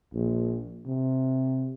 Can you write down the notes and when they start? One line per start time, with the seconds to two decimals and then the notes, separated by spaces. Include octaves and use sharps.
0.14 A#1
0.86 C3